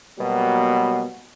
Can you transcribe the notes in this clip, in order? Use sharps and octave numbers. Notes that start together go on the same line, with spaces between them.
B2 F#3 G3 A#3 B3